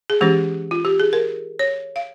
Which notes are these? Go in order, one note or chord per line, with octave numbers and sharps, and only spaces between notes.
G#4
E3 G#3 C#4 G4
F4
G4
G#4
A#4
C#5
F5